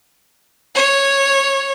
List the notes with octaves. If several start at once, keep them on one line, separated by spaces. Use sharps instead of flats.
C#5